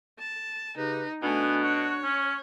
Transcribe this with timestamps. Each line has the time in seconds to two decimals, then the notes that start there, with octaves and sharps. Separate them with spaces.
0.19 A5
0.77 C#3 D#4 G4 B4
1.23 B2 A3 B3 D4 G#5
1.64 F#4 C#5
2.04 C#4